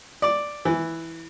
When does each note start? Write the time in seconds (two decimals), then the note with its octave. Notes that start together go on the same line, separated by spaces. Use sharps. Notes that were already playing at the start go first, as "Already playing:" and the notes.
0.22 D5
0.65 E3